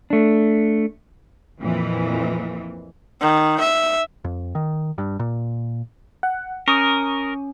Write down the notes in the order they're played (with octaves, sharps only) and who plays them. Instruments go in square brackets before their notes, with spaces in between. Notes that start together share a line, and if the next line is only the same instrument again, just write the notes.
[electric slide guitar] A3 D4
[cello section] F2 A#2 E3
[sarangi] D#3
E5
[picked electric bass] F2
D#3
G2
A#2
[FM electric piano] F#5
[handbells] C#4 [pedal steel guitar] A#4 [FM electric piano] C#6 D#6